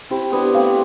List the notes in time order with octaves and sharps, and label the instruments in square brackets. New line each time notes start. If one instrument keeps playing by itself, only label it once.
[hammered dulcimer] C4 E4 [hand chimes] G4
[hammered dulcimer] B3 D4 [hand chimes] G4
[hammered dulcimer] A3 C4 [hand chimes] F5